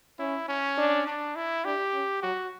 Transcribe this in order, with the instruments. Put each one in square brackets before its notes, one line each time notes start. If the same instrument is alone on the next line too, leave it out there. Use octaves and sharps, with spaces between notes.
[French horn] C#4 [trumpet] E4
[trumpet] C#4
[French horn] D4
[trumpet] D4
E4
[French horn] D4 [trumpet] G4
[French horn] C#4
[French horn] F#3 [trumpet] F#4